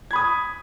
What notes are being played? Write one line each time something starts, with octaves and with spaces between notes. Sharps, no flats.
B5 D#6 G#6